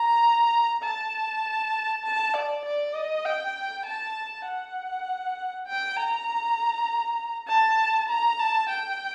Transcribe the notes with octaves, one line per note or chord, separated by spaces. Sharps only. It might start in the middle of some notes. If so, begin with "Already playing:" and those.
Already playing: A#5
A5
A5
D5
D5
D#5
G5
A5
F#5
G5
A#5
A5
A#5
A5
G5